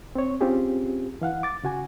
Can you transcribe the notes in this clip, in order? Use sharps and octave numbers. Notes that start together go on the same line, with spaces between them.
C4 C#5
C4 C#4 F4 G4 G#4
E3 F5 F#5
D6 A6
C#3 F#4 G#5